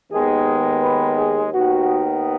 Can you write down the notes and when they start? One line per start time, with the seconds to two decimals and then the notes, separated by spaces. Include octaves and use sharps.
0.12 D#2 D#3 G#3 B3 G#4
0.82 B4
1.17 G#4
1.53 D#2 D#3 B3 F#4